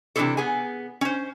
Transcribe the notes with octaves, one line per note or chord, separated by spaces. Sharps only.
C3 E3 D4 E4 G#4 A4
B3 G#4 G#5
C#4 C5